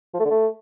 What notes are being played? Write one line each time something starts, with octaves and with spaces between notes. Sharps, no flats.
F3
A3
D3
A3